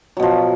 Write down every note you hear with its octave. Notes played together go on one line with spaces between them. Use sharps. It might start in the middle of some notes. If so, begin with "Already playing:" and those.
B2 F3 F#3